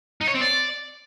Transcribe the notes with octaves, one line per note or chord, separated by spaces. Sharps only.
D#4
C#5
C4
D5